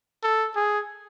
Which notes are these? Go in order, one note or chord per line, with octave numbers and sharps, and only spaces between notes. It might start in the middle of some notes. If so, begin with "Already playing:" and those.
A4
G#4